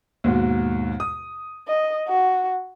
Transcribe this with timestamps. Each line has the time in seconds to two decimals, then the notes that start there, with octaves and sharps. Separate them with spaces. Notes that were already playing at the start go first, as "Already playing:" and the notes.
0.24 D#2 G#2 B2
1.00 D#6
1.68 D#5
2.08 F#4